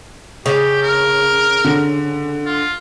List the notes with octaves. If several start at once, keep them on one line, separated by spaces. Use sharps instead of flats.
C#3 G4
A#4
D3
F4